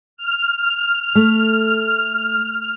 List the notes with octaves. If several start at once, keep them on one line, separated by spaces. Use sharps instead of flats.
F6
A3